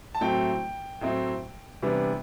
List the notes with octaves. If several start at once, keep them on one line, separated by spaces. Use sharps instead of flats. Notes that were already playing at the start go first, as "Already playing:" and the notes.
A5
A2 F#3 A3 C4 E4 G5
A2 F#3 A3 C4 E4
C3 E3 G3 B3 D4